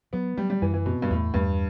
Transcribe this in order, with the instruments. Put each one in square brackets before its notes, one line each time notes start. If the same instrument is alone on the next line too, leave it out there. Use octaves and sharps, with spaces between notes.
[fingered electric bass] F#3 [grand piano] B3
[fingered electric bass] F#3 [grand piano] G3
[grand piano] G3
[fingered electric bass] F#2 [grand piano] E3
[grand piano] E3
[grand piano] B2 [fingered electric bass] C4
[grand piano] G2
[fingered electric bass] E2 [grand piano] A2
[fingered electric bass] E2 [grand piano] G2